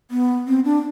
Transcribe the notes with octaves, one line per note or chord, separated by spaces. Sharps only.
B3
C4
D4